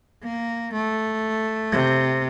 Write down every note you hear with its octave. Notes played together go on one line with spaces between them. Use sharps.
A#3
A3
C3